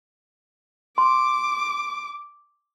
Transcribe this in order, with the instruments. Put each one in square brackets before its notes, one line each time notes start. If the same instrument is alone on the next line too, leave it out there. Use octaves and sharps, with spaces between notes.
[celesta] C6 [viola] D6